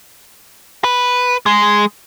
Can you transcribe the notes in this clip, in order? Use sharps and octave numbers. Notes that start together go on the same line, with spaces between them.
B4
G#3